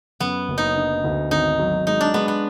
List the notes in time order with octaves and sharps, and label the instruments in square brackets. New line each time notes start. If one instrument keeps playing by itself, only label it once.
[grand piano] F#2 [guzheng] B3
[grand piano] F#1
[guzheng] D#4
[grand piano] D3
D2
[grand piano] G#1 [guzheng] D#4
[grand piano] F#3
[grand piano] G#3 [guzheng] D#4
[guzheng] D4
[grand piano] G#3 [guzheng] B3
[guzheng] B3